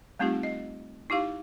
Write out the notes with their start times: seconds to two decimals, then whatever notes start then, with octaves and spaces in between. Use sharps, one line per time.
0.19 G3 A3 C4 D#4 F4 G4
0.43 D#5
1.10 D#4 E4 G4 F5